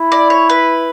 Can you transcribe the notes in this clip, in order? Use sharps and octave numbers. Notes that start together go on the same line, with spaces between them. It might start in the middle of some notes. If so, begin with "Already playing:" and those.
Already playing: E4
D5
C#5
B4